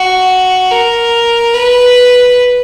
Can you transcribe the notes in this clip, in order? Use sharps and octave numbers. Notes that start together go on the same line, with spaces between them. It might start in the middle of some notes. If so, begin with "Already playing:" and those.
Already playing: F#4
A#4
B4